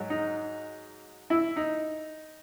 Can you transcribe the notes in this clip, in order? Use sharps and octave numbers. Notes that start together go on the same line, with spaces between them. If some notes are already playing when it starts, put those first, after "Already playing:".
Already playing: G#2 F#3
D#4
E4
D#4